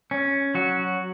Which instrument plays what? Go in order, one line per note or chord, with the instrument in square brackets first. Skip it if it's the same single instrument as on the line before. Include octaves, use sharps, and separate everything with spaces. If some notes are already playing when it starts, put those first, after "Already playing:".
[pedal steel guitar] C#4
F#3 F#4